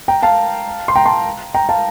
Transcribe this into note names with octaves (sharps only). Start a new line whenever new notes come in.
G5 A#5
F5 A5
C6
G5 A#5
A5 C6
G5 A#5
F5 A5